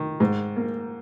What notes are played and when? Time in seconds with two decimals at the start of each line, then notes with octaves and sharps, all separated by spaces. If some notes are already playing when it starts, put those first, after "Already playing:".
Already playing: D#3
0.20 G#2
0.56 A#3